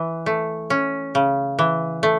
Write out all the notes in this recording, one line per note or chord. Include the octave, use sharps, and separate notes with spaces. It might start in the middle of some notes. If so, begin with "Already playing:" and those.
Already playing: E3
A3
C#4
C#3
E3
A3